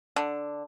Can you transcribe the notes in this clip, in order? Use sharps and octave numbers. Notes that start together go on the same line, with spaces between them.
D3